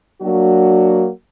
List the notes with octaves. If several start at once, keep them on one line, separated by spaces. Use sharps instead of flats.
F#3 A#3 D4 F#4